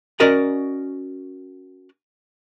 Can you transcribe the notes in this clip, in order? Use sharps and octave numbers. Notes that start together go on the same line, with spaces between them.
C#4 F#4 A#4 D5 D#5 A#5